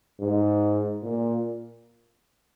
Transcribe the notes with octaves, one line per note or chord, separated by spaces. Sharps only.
G#2
A#2